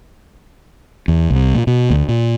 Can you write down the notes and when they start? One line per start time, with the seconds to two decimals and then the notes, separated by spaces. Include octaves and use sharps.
1.08 E2
1.31 C2
1.55 A#2
1.67 B2
1.90 D2
2.08 A#2